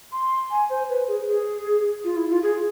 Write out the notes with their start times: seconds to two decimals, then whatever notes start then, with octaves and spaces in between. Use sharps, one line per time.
0.12 C6
0.51 G#5
0.70 C5
0.89 B4
1.08 G#4
1.27 G#4
2.04 F4
2.17 E4
2.30 F4
2.43 G#4